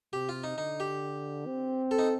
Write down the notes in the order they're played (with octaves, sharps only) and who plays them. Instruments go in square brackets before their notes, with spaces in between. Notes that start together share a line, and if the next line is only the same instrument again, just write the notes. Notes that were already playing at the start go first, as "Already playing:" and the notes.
[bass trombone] C3 [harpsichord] G4
[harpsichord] F4
D#4
[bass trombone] D3 [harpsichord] D#4
[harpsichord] G4
[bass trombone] C4
[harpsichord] A4
D#4